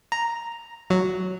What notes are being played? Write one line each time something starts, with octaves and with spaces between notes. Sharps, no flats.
A#5
F#3